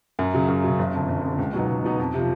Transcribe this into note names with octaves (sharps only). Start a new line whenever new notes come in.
F#2
C#3 F#3
F#2
C#3 F#3
F#1
F2 D3
F#1
F2 D3
C#2
B2 F#3 B3 D#4
C#2
B2 F#3 B3 D#4
F2
C3 F3